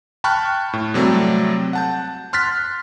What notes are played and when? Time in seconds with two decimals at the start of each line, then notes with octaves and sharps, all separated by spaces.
0.24 G5 A5 B5 C#6 F6 F#6
0.73 A2
0.94 C3 F#3 G3 A3 C4
1.73 F#5 A5 G6
2.33 C6 F6 F#6 A6 B6